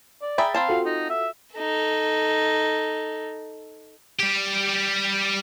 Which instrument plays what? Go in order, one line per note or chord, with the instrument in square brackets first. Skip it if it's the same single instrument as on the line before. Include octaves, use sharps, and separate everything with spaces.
[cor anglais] D5
[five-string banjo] G#4 E5 G5 [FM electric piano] A#5 B5 A6
[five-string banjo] C4 C5 A5 [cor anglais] F5
[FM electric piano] F4 F#4 A4
[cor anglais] D#4
E5
[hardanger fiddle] D#4 A4
[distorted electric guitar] G3 G4